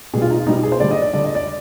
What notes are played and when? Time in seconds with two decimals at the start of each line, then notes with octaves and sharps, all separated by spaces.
0.14 B2 G#4
0.16 G3
0.22 F4
0.30 D#4
0.39 F4
0.47 B2 G3 D#4
0.63 G#4
0.72 C5
0.80 D3 D5
0.84 G3
0.91 D#5
1.02 D5
1.13 D3 G3 D5
1.24 D#5
1.35 D5